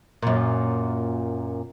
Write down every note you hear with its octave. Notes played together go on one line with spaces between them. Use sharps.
F#2 A#2